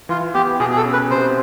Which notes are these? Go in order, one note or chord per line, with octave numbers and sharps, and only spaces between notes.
E3 F4
B3 G4
B2 G#4
G#4
A4
C#4
B4
C3 C5